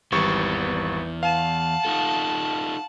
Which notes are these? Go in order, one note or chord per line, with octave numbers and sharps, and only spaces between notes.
G#1 E2 E3 G3 B4 C#6
F5 F#5 A5
D#4 F4 A4